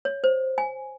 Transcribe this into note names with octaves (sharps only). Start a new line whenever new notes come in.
C#5
C5
G#5